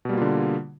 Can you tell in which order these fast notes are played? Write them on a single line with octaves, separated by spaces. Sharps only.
B2 G3 A#3 F4 D3